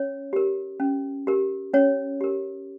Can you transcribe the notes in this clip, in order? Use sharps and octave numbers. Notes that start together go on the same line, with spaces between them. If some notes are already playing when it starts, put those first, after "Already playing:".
Already playing: C#4 C#5
G4 A#4
C#4
G4 A#4
C#4 C#5
G4 A#4